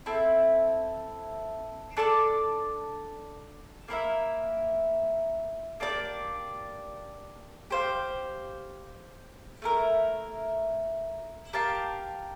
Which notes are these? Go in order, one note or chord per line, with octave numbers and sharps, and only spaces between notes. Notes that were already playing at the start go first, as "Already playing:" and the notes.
C4 E4 A4
D4 A4 D5 A5
A#3 E4 A#4 E5
A#3 D4 G4 D5
G4 C5 F5
A3 E4 A#4
G4 A#4 F5 A5